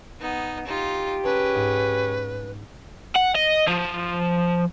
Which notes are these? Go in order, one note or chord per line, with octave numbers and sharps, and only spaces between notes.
B3 D#4
D#4 F4 G4
C#4 G#4 B4 A5
G#2
F#5
D#5
F3